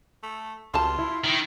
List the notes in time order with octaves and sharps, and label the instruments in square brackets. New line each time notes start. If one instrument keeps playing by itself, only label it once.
[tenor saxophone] A3
[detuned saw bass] C#2 [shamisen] F#3 G3 A5 [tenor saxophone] F4
[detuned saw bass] E4
[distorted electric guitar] D#3